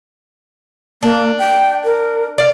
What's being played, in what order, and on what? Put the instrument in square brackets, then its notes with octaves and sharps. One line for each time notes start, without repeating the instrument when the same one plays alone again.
[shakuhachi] A#3 [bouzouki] D4
[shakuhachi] G5
A#4
[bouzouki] D5 F5